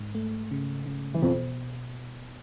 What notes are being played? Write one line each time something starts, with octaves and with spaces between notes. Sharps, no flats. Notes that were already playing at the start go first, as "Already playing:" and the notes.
Already playing: G#2
A3
C#3
C#3
E3
F2 B2 F3